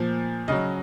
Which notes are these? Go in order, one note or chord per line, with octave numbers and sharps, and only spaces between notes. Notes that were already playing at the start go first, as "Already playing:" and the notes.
Already playing: A#2 F3 C5
C#3 F#3 D#5